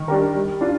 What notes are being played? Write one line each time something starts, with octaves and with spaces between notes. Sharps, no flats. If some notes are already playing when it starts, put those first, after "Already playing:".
Already playing: D#3
G3 D4 G4 A#4
G3
D4 F4